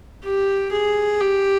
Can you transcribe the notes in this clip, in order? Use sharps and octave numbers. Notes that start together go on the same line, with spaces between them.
G4
G#4
G4